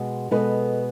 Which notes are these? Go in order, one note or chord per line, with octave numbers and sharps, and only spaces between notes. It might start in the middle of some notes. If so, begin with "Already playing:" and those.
Already playing: B2 G#3 B3
B2 G#3 B3 A4 B4